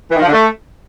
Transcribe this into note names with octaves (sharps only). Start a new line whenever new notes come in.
E3
D#3
F3
D3
A3